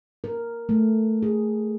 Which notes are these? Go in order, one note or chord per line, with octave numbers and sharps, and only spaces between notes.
A#4
A3
G#4